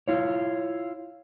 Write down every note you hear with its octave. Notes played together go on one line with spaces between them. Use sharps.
E4 F4 C#5